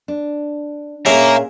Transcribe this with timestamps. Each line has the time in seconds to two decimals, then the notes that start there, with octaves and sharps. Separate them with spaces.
0.08 D4
1.06 A#2 C#4 G#4 A#4 E5 F5 A#5